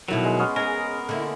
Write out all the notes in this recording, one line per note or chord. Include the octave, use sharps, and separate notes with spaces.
B2 D#3 F#3 G3 E4 A4 A#4
G#3
B3 C#4 C6 D#6 F6
G#3 C#4 G#4 A#4
D3 A#3 E4